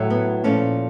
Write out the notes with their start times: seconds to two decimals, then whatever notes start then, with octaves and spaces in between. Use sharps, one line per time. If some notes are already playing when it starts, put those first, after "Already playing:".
Already playing: A2 F#3 A3
0.10 B3
0.44 A#2 F3 A3 C#4